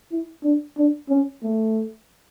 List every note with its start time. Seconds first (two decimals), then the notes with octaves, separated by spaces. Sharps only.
0.12 E4
0.44 D4
0.77 D4
1.09 C#4
1.43 A3